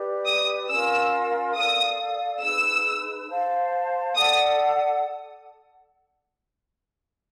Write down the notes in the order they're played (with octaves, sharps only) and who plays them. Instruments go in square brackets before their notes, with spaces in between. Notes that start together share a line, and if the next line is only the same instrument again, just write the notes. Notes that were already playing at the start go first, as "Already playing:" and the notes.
Already playing: [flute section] G4 B4 D5
[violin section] D#6
[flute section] C#4 F4 A#4 [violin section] E6
[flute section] A4 D5 F5 [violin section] D#6
[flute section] D#4 G#4 B4 [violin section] E6
[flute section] C5 F5 A5
[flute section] A4 D5 F#5 A5 [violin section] D#6